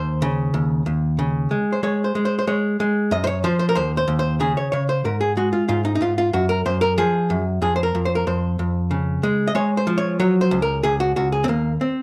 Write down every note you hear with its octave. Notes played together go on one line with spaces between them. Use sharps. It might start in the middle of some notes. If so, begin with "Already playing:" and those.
Already playing: D#2 C5
C#3
D#2
D#2
C#3
G#3
C5
G#3 C#5
C5
G#3
C5
C5
G#3 C#5
G#3
F#2 D#5
C5
C#5
F3 C5
C5
A#4
D#2 C5
C5
D#2
C5
C#3 G#4
C#5
C#3 C#5
C5
G#2 A#4
G#4
G#3 F#4
F4
G#2 F4
D#4
D#4
G#2 F4
F4
F#2 F#4
A#4
F#2 C5
A#4
F3 G#4
F#2
F2 G#4
C5
A#4
F2
C5
A#4
F2 C5
F2
C#3
G#3
D#5
G#3 C#5
C5
F3
C#5
F#3 C#5
C5
C#2
A#4
C#2 G#4
F#4
C#2 F#4
G#4
C4
D#2 A#3
C4